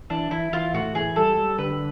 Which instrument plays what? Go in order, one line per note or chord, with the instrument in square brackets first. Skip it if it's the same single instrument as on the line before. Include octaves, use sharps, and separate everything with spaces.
[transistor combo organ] E3 [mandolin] D4
[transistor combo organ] E3 [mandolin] E4
[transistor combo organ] E3 [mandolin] F4
[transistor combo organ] A2 [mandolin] F#4
[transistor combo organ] E3 [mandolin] G#4
[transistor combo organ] G3 [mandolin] A4
[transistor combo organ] G3
[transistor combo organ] D3 [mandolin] B4